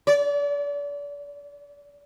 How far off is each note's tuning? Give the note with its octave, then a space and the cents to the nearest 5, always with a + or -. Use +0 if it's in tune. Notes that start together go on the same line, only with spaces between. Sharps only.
D5 -35